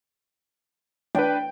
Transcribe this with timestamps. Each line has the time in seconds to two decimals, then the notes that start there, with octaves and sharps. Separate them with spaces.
1.15 D4 B4 G5